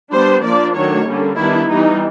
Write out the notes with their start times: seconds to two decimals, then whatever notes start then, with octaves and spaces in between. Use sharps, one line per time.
0.12 G3 B3 D4 C5
0.43 F3 A#3 D4 D5
0.75 D#3 F#3 A3 D4 C#5
1.07 D3 G3 A#3 C#4
1.37 D#3 G3 B3 D4 E4
1.69 E3 G3 B3 D#4